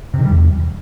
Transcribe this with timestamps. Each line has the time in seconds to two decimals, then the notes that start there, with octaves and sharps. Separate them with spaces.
0.14 C3
0.19 D#3
0.25 G3
0.30 E2